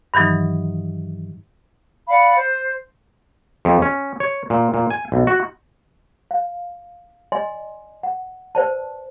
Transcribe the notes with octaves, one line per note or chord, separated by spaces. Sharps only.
G2 D#3 E3 F#3 D#4
D5 F5 F#5 B5
C5
F2
C#4
C#5
A#2
A#2
G#5
B1
F#4
F5
D5 D#5 G#5 C6
F#5
B4 C5 D5 A5